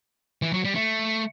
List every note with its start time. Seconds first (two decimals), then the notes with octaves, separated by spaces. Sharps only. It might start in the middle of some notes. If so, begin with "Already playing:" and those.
0.42 E3
0.53 F#3
0.65 G3
0.75 A3